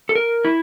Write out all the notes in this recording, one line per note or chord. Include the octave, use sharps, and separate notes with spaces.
A4
A#4
E4